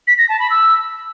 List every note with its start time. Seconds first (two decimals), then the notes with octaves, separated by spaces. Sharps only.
0.07 B6
0.18 A#6
0.29 A5
0.40 B5
0.50 E6